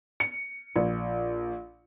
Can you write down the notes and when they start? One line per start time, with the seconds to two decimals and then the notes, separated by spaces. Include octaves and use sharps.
0.20 C#7
0.76 A#1